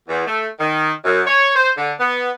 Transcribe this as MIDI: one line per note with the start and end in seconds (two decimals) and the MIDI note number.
0.08 0.25 40
0.27 0.47 57
0.60 0.91 51
1.05 1.21 42
1.27 1.51 73
1.56 1.72 72
1.77 1.93 50
2.00 2.30 59